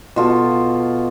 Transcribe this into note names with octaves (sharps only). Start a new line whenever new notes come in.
B2 F4 A4